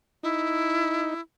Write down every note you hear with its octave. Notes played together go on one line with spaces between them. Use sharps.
D#4 E4